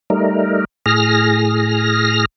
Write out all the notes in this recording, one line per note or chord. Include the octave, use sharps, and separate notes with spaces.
G3 A3 D#4 A#4
A2 G#4 F6 A#6